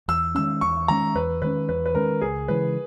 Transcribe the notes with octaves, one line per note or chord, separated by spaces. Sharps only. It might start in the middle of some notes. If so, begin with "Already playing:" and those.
E2 E6
D#3 G#3 C#4 E6
E2 C#6
D#3 G#3 C#4 A#5
E2 B4
D#3 G#3 C#4 B4
E2 B4
B4
D#3 G#3 C#4 A#4
C#2 G#4
C#3 E3 G#3 B4